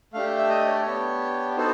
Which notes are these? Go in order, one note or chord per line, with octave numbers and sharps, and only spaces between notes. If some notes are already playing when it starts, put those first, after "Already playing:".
A3 D4 G4 F5
E5
D#5
C#5
D5
B3 D4 G4 C#5
B3 D#4 F#4 A4 C5